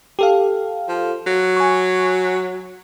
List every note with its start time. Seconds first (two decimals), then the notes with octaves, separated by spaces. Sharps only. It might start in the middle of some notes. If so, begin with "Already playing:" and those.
0.19 G4 A4 F5
0.89 F3
1.26 F#3
1.57 G#5 C#6